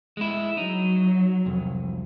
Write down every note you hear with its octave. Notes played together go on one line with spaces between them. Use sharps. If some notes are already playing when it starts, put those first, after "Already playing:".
G#3 E4
F#3 D#4
C2 F2